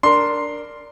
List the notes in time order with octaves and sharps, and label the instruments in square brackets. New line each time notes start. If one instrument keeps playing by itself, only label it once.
[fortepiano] D4 A#4 [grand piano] C6